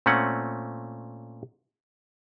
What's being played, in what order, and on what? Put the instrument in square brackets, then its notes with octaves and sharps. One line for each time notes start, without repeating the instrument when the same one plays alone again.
[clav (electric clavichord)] A#2 A3 C4 C#4 F#5